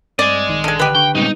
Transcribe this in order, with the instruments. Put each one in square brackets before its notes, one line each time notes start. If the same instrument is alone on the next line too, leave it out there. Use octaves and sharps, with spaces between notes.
[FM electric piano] G2 C4 [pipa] D5 [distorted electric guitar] D#5 G#5
[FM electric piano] A#1 D#3
[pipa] D3 G#3
[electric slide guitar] D3 [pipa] G4 B4
[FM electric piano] D3 C#6 [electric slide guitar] G5
[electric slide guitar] A#2 C#3 C4 [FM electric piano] G3 G#3 B3 [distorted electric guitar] D#4